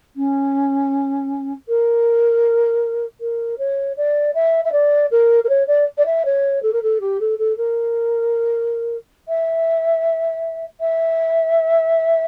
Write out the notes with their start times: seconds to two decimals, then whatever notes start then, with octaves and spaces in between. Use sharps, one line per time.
0.16 C#4
1.68 A#4
3.21 A#4
3.58 C#5
3.97 D5
4.35 E5
4.65 E5
4.72 D5
5.11 A#4
5.44 A#4
5.49 C#5
5.67 D5
5.98 D5
6.06 E5
6.25 C#5
6.63 A4
6.73 A#4
6.83 A4
7.00 G4
7.20 A4
7.39 A4
7.57 A#4
9.28 E5
10.81 E5